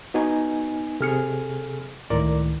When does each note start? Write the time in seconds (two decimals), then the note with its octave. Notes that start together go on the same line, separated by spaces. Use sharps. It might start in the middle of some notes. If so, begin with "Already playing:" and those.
0.14 B3 D#4 F#4 G#5
1.01 C3 G#4 A4 F6 C#7
2.10 C#2 A2 D#3 A#4 D5